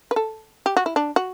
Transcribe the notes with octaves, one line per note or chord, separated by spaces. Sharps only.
B4
A4
G4
F#4
E4
D4
F#4